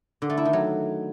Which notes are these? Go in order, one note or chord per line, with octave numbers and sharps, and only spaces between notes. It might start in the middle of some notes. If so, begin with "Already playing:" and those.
D3
A3
E4
D#3
F#3